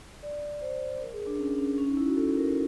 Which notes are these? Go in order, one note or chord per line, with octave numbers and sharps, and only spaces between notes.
D5
C5
A#4
G#4
D4
C#4
C#4
C#4
D#4
E4
F#4
A4
A#4